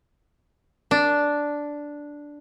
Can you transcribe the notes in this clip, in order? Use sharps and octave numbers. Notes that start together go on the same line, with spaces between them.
D4